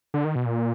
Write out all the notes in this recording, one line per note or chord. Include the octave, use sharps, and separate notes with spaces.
D3
D#3
B2
A#2